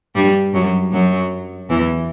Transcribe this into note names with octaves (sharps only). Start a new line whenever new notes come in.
G2 G3
F#2 F#3
F#2 F#3
E2 E3